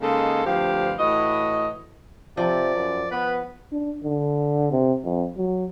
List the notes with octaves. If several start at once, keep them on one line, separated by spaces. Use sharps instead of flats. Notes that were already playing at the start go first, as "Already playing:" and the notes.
C#3 G#3 A#3 D#4 A4
D2 G2 F3 C4 G4 F5
A2 E3 F#4 D#5
C3 F3 D5
F#2
B3 B4
D4
D3
C3
F2
F#3